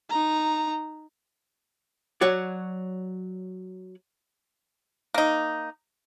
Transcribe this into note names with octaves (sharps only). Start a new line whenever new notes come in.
D#4 A#5
F#3 F#4 C#5 D5
A#3 D#4